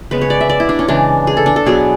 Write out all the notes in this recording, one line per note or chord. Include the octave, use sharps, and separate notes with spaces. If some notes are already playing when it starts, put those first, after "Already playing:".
C#3 G#3 B3 B4
C#5
D5
E5
D5
E4
D4
C#4
C#3 E3 G#3 D4
G#4
A4
D4
A4
B2 F#3 B3 G#4